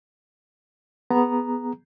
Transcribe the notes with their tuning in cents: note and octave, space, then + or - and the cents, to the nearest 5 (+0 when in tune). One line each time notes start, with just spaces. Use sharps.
B3 +0 G#4 +0 A#5 +0